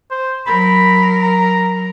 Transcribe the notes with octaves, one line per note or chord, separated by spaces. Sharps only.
C5
F#3 A#4 B5
A#5